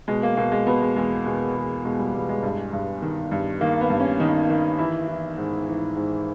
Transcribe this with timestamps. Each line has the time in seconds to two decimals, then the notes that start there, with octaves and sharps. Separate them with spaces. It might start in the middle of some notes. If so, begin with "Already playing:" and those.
0.08 B2 G#3
0.23 A#3
0.37 B2 A#3
0.52 G#3
0.67 B2 B3
0.82 G#3
0.96 E2 G#3
1.25 B2 G#3
1.55 E2
1.84 B2 G#3
1.99 G3
2.14 E2 G3
2.29 G#3
2.43 G2
2.73 G2
3.02 D#3
3.31 G2
3.61 D#3 A#3
3.81 B3
3.90 G2
4.00 C#4
4.20 D#3 D#4
4.49 D#3
4.79 E3 E4
5.08 E3
5.37 G#2
5.67 E3
5.96 G#2